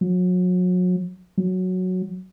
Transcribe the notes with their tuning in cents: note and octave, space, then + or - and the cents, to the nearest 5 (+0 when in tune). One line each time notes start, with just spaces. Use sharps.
F#3 -35
F#3 -5